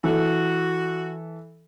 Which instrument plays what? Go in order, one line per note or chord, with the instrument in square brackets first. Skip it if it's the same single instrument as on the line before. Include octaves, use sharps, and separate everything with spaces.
[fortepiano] E3 A4 [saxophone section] F#4